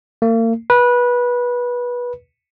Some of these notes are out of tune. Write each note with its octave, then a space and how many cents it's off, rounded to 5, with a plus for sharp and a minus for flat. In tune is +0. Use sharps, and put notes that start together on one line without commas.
A#3 -40
B4 -20